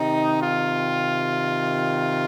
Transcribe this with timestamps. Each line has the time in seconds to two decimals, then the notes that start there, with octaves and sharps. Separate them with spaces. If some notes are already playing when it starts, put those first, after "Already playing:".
Already playing: C3 D#3 D#4
0.38 F4